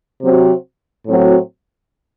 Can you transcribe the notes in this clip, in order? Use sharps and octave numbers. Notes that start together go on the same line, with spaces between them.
C3 F#3 C4 F#4
A2 F#3 C4 F#4